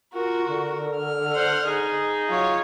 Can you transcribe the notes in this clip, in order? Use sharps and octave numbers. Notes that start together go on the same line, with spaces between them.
F4 F#4 A#4
D3
F6
C5 F#5
D#4 G#4
F#3 F4 C#5